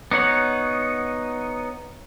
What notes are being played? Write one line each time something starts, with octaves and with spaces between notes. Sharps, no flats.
B3 D#4 C#5 F#5